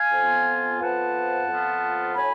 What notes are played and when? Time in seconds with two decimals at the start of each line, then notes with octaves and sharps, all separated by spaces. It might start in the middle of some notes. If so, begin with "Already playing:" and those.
Already playing: F5 G#5
0.12 F2 F3 B3 F4
0.81 F2 F3 B3 F4 F#5 A5
1.48 F2 F3 B3 F4
2.16 A2 F#3 G#5 B5